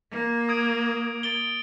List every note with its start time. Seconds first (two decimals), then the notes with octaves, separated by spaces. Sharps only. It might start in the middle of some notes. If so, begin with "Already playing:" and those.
0.12 A#3
0.49 D#6 G#6 D7
1.23 A6 D7 G7